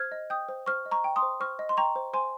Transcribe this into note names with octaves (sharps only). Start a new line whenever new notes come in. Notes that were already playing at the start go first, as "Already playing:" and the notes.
Already playing: C5 F6 G#6
D#5
G5 D#6 G6
C5
C5 C#6 F6
D#5
A#5 C#6
G5
C6 D#6
C5
C5 C#6 F6
D#5
C6
G5 A#5 C#6
C5
C5 G#5 C6